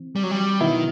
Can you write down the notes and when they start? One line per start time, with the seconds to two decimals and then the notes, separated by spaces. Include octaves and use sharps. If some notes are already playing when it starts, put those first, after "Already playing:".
Already playing: E3 C4
0.16 G3
0.23 F#3
0.31 G3
0.60 B2 D#3 F#3 B3 E4